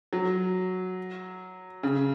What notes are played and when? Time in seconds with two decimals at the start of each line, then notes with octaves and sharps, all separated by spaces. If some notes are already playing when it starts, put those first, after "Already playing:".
0.13 F#3
1.83 C#3